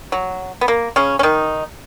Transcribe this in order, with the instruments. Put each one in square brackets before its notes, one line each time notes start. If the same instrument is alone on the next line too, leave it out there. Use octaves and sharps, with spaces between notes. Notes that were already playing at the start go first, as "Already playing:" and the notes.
[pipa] F#3
B3
A#3
C#3 C#4
C#4
D#3 D#4